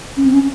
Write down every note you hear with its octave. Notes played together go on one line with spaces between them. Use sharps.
C#4
C4
C#4